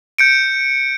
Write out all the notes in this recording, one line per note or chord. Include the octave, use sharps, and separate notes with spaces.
G6 C#7 D7